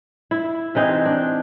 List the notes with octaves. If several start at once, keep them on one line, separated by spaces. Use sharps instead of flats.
E4
C3 E3 G#3 C4 D#4
D4